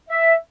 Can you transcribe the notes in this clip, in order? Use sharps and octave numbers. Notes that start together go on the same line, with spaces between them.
E5